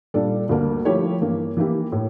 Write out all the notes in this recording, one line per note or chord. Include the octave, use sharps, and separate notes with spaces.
A#2 G3 D4 A4 D5
D2 D3 G3 A#3 D4
F3 A3 E4 G4 C#5
G2 E3 A#3
E3 A#3 E4 G4
A2